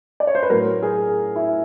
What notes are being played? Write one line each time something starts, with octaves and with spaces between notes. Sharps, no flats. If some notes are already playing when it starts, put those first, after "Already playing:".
D5
C#5
C5
B4
A2 F#3 A#4
G#4
E4